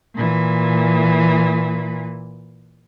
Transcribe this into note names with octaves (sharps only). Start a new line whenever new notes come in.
A#2 E3